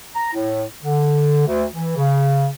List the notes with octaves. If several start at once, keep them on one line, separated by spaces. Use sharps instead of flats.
A#5
A2
D3
D2
E3
C#3